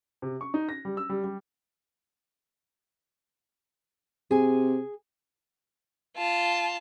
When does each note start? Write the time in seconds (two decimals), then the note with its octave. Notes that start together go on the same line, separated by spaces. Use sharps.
0.22 C3
0.41 C#6
0.54 D#4
0.69 A#6
0.85 G3
0.97 E6
1.09 G3
1.24 G3
4.31 C3 G#4 G#5
6.17 F4 A5